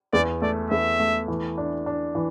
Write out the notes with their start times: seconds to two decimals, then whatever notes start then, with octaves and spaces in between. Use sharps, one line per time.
0.13 E2 D5
0.42 A3 D5
0.70 E2 E5
1.00 A3
1.28 E3
1.58 D4
1.86 D4
2.15 E3